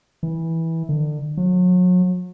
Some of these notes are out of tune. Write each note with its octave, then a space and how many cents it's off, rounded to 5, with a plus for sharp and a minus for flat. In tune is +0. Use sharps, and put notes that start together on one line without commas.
E3 -15
D3 +30
F#3 -35